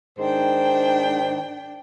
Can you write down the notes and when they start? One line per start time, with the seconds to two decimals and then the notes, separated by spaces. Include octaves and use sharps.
0.19 G#2 D#3 D4 C5 G5